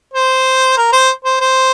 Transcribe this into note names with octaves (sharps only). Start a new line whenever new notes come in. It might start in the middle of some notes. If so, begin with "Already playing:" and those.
C5
A#4
C5
C5
C5